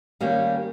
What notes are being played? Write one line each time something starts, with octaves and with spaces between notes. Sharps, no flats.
D#3 G3 A#3 C#4